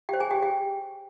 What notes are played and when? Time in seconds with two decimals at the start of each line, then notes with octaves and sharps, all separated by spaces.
0.09 G4 C5 G5
0.20 G#4 G#5
0.31 G4 G5
0.42 G4 G5